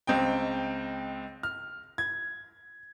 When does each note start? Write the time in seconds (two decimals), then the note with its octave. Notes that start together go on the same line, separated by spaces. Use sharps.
0.07 C#2 C4 D#5 G5
1.43 F6
1.98 G#6